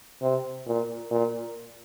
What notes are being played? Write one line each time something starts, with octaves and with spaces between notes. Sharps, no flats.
C3
A#2
A#2